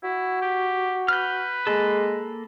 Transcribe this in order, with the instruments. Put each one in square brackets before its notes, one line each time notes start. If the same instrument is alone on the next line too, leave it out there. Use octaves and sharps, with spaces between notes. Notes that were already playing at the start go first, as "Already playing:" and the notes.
[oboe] E4 [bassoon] F#4
[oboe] G4
[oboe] B4 [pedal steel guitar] F6 G6
[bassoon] G#3 [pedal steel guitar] A#3 A4